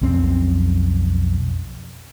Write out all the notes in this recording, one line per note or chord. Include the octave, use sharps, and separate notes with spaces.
B1 F2 C4 C#4